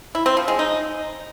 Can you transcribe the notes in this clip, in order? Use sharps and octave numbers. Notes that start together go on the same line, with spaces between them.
E4
C4
F3
G#3
D#4